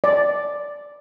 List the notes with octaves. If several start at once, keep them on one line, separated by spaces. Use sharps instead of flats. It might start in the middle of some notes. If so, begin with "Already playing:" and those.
D5